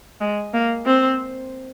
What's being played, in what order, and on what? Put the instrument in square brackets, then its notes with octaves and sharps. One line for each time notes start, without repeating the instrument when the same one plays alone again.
[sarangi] G#3
A#3
C4